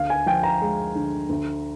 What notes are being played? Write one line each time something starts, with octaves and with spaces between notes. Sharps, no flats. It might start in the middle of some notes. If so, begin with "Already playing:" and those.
Already playing: D2 F5
G#5
F3 G5
A#5
G#3
D3
D2